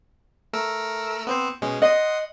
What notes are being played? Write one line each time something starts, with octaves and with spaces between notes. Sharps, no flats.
A3 A#4 E6
B3 C4 C5
B2 G#3 C#4
D#5 F#5 C6 D#6